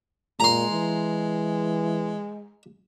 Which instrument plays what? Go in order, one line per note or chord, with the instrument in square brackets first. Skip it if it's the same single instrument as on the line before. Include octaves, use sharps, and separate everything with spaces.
[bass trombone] A#2 [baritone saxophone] G#3 [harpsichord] A#5 C6
[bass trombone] E3